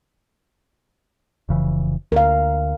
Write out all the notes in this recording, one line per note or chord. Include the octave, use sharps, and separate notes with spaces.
F1 C#3 E3
D2 A#4 F5